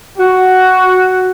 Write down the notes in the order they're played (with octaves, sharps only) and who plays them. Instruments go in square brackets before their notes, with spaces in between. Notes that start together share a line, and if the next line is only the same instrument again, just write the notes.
[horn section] F#4